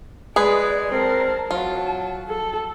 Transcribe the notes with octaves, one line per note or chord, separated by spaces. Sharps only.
G#3 G#4 B4 D5
C4 A#4 A5
F#3 F4 A5
A4